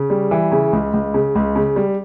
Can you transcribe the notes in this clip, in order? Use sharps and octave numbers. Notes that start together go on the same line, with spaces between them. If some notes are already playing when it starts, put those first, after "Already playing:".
Already playing: C#3
G3
E3
C#3
C#2
C#2
C#3
C#2
C#3
G3